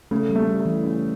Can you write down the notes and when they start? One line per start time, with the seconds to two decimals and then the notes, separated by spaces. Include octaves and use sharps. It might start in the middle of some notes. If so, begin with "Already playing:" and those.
0.11 C#3 A3
0.30 G3
0.35 A3
0.47 G3
0.60 A3
0.66 E3
0.84 C#3